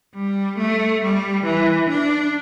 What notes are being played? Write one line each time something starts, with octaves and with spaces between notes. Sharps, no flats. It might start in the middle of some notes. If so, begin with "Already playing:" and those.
G3
A3
G3
E3
D4